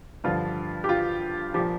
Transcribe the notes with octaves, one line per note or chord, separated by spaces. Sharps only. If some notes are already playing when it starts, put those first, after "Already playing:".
G2 D3 F3 F4
G4
F4
A#2 F3 G4